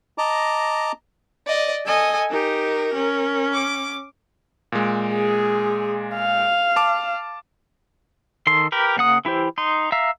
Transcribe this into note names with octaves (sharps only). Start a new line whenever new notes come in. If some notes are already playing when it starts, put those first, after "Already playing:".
D#5 A5 A#5 D6
D5 D#5
A4 D#5 G#5
D#4 G4 A#4
C#4
D6
A#2 G#3
G#4
F5
A5 D6
D#3 A4 C6
G4 A#4 B4
C#3 A#3 F#5 D#6
E3 E4 G4 C5
D#4 C6
E5 F5 A#5